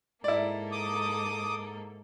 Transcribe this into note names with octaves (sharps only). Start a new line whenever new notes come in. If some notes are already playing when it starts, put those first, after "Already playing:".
G#2 A#3 E4 A4 D5
D6 D#6